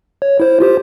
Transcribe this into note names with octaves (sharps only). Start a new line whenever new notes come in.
C#5
E4 C5
F4 G4 C5